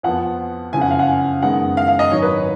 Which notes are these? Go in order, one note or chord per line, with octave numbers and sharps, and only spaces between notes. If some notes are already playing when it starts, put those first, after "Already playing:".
F2 F3 B3 F#5
F#1 F2 C#3 G#5
F#5
F5
F#5
G#5
F#2 D#3 G#3 B3 F#5
F5
F5
D#5
G#1 G#2 F#3 C#5
B4